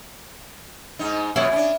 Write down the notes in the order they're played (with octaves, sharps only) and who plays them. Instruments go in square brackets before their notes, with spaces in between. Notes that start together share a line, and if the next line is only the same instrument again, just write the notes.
[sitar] G#2 D#4
[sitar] F2 B2 C#5 [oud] E4
[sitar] C#4 D4